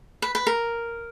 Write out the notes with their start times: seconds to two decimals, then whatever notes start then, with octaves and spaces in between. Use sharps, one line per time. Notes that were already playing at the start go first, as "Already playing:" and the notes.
0.22 B4
0.35 B4
0.47 A#4